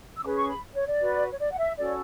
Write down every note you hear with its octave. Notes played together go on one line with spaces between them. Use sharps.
E6
C#4 G#4 B4 D6
C#6
B5
C#5
D5
F#4 B4
C#5
D5
F#5
E5
C#4 F#4 A4 C#5 D5